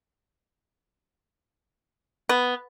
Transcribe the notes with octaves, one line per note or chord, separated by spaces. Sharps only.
B3